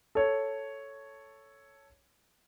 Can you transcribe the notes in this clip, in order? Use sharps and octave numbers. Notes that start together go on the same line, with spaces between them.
A4 C#5